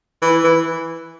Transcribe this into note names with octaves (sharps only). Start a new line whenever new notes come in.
E3
E3